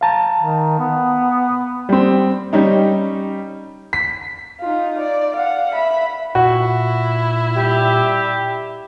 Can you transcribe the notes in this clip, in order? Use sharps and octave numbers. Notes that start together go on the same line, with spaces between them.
F5 A5 A#5
D#3
B3
G3 C4
G3 C#4 D#4
B6
D#4 F4
D5
F5 F#5
E5 B5
A#2 E4 F#4
G3 G4 E5